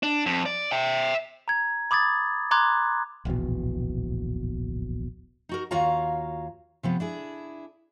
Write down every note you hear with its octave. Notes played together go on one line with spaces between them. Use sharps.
D4
F2
D5
E5 G5
A#5 G#6
B5 D6 D#6 G#6 A6
A#5 C6 D6 F#6 G#6
D1 A#1 E2 B2
D#4 F#4 A#4
D#2 F4 F#4 C#5 F5 A#5
C3 F3 B3
D4 E4 G#4